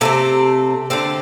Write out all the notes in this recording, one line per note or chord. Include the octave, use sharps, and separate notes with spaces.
C3 A3 C4 A4
D3 A3 C4 A4